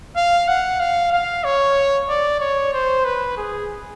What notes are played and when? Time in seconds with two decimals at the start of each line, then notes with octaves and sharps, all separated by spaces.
0.16 F5
0.48 F#5
0.80 F5
1.12 F5
1.44 C#5
2.09 D5
2.40 C#5
2.73 C5
3.05 B4
3.37 G#4